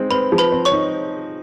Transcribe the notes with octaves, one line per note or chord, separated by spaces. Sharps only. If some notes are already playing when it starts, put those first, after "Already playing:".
Already playing: G#3 C4 D#4
C4 B4 B5
F3
B4 B5
C4
C#5 C#6
D#4